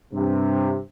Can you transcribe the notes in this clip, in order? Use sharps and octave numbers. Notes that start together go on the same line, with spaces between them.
G2 C3